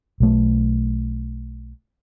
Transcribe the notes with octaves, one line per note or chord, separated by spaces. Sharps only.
B1 A3